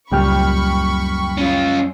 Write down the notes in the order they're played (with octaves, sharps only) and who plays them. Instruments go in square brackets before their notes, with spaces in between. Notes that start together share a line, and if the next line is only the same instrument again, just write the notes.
[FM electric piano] C#2 G5 F6 [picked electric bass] F#2 A#2 G3 [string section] B5 C#6
[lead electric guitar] C#4 F4